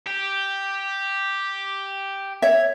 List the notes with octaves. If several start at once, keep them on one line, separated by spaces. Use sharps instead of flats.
G4
C#5 E5